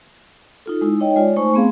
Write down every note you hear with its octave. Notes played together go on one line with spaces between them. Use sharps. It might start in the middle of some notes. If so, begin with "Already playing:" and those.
D#4 F4 A4
G#3 D#4 E4
D#4 C#5 D#5 G5
G#3 F4 C#5 D5
A3 D#4 C5 G#5 C#6
A3 B3 C4 G#4 F5